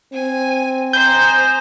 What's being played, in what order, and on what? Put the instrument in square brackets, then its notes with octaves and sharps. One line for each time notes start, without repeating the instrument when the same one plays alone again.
[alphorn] C4 [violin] G#5
[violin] C5 [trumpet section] D#5 G#5 A#5 [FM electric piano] G6